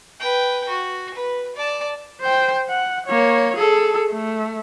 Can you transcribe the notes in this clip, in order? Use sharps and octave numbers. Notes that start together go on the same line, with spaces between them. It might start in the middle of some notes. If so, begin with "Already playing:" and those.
B4 G5
F#4
B4
D5 A5
C5 G5
F#5
A#3 C#5
G#4 A4
A3